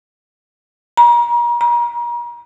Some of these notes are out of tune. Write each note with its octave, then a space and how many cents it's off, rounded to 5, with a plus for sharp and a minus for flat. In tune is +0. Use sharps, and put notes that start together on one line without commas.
A#5 +35
A#5 +40